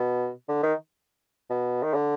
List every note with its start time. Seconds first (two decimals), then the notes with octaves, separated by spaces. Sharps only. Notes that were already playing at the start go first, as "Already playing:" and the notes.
Already playing: B2
0.48 D3
0.63 D#3
1.50 B2
1.83 D#3
1.94 D3